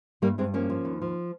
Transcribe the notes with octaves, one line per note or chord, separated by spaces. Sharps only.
G2 G3 A#3
G2 G#3 C4
F3 A#3 C#4
F3
D#2
F3